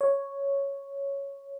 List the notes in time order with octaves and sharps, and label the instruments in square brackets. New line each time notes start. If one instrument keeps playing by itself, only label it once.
[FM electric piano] C#5